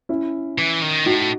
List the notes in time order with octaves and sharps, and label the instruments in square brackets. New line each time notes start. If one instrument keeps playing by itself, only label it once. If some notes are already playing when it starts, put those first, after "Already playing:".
[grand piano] C#4 E4
[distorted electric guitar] E3
D#3
[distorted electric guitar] A2 [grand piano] D#4 F#4